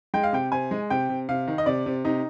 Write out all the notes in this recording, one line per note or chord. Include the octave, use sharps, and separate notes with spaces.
G#3 G5
F5
C3 G5
C3 G#5
G#3
C3 G5
C3
C3 F5
D#3
D#5
C3 D5
C3
C3 D#4